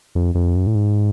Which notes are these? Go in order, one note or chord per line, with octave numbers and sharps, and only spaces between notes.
F2
F2
F#2
A2
G#2